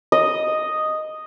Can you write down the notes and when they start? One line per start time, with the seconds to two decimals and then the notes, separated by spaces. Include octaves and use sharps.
0.12 D#5